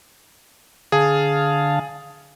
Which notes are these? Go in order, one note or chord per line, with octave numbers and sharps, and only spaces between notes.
D3 G#4 F5 A5